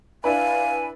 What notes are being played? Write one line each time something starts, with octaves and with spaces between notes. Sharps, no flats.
D4 E4 B4 F5 G#5